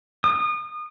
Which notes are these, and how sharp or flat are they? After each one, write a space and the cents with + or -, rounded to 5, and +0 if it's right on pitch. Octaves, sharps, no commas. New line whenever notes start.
D#6 -30